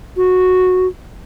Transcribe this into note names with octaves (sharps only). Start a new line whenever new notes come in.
F#4